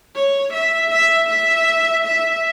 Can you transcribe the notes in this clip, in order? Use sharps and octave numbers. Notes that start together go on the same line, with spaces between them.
C#5
E5
E5
E5
E5